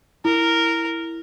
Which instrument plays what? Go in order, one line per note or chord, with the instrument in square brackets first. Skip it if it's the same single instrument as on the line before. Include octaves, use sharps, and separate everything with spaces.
[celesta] E4 [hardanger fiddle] A#4